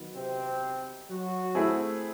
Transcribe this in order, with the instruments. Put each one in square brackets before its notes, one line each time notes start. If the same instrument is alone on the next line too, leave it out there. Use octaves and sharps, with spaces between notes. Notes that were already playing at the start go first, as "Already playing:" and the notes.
Already playing: [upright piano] D#3 F#3 B3
[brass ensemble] C3 C4
F#3 F#4
[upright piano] A3 C4 E4 G#4